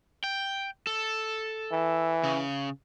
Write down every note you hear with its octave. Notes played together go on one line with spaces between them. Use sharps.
G5
A4
E3
C#3